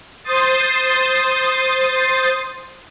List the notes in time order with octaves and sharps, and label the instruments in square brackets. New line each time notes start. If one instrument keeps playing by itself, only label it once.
[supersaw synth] C5 C6 D#6 A6